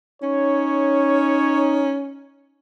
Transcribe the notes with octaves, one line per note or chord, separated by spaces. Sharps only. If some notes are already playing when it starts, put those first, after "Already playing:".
C#4 D#4 C#5